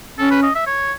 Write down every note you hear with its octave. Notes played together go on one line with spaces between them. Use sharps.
C#4 A4
B4
D#5
E5
C#5